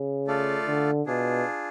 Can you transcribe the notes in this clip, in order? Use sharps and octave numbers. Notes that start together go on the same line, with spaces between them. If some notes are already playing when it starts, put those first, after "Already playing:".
Already playing: C#3
A3 F4 A4 D5 F5
D3
B2 D4 F4 G#4